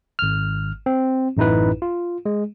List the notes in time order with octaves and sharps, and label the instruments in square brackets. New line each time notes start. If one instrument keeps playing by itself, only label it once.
[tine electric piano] G#1 F6
C4
A1 F#2 D#4 E4 B4
F4
G#3